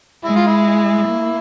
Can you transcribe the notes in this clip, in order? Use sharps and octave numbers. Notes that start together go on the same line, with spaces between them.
G#3 E4
F4
E4
A#3